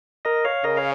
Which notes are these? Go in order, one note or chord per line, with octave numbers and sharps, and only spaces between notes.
A#4 D#5
C#5 F5
C#3 A#4 D#5
C#5 F5